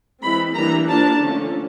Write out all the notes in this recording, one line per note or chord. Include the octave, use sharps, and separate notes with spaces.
E3 G#3 C4 B5
E3 G3 A#3 D4 A#5
F3 A#3 D4 A5
D3 F3 A3 C#4